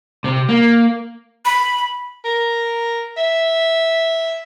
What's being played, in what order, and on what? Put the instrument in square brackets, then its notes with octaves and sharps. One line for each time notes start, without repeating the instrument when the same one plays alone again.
[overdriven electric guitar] C3
A#3
[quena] B5
[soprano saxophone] A#4
E5